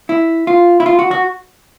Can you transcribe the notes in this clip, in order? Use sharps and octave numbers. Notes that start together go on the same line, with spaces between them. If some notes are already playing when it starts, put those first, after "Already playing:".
E4
F4
E4
F4
F#4
F#4